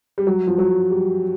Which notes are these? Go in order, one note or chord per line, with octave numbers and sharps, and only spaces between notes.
G3
F#3
F3
F#3
G3